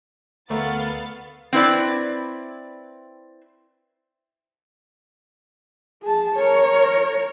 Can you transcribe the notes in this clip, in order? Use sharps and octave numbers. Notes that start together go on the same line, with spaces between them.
D2 A3 B3 A#4 F5 A6
C4 E4 B4 D5
G#4 A5
A#4 C#5